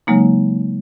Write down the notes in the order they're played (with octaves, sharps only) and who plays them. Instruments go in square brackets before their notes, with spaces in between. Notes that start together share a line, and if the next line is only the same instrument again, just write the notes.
[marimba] C#3 F#3 G#3 A#3 D#4